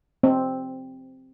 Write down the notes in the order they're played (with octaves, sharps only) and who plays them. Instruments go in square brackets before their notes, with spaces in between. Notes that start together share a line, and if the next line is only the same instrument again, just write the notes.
[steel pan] C4